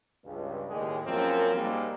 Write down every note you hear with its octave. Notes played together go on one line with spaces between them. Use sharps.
C#2 G2
D#2 A2 D#3 G#3 G4 G#4
F#2 F3 A#3 C4 C#4 A#4
G#2 G3 G#3 A#3